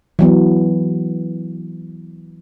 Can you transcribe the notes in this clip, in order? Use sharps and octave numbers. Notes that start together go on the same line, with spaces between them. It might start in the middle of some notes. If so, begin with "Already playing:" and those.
E3 F#3 B3